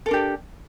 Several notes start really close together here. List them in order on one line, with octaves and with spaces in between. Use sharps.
A4 A#4 D4 G4